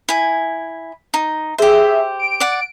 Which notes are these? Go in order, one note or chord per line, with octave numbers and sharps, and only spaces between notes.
E4 G#5
D#4
G4 G#4 C5 E5
D7
D5 F#5